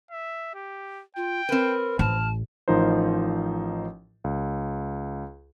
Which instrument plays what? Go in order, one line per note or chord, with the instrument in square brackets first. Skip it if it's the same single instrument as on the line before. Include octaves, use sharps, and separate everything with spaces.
[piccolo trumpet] E5
G4
[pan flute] F4 [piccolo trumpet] G5
[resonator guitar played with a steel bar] C4 B4 [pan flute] A#4
[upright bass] A1 [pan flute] A5 [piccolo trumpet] F6
[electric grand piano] A1 F3 D#4 A#4 C5
C#2